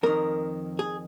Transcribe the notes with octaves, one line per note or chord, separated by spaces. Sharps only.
F2 D#3 A#4
G#4